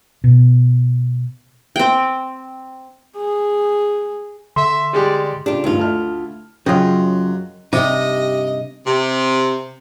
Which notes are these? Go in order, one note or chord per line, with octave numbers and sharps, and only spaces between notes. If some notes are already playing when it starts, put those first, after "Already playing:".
B2
C4 G5
G#4
D3 E5 C6
G3 G#3 G4 D5
C#3 D4 F4 G4
D2 G2 D#3 F4
A3 E4 A5 F6
F#2 C#3 F#3 F4 D#5 G5
G2 C3 D#4 G4 D#5
C3